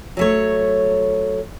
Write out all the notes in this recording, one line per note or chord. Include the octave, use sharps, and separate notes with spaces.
F#3 A3 C#5